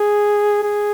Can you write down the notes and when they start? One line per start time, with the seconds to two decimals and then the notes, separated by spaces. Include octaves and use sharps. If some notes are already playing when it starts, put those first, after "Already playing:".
Already playing: G#4
0.62 G#4